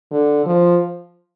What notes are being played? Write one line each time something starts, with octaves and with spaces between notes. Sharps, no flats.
D3
F3